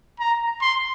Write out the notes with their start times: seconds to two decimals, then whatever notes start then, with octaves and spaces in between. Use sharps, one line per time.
0.20 A#5
0.62 C6